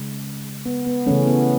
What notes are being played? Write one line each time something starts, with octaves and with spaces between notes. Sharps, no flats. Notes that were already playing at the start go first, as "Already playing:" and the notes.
Already playing: C#3 G#3
B3
B3
C#3 E3 A3 C#4
B3